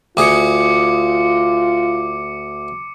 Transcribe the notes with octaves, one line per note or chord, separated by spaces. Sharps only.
D2 F4 G#4 D6 C#7